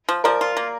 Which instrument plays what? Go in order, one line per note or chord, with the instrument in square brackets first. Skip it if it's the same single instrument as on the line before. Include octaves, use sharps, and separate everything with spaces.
[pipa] F3
[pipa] F3 [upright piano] A#4 D5
[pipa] F4
A#3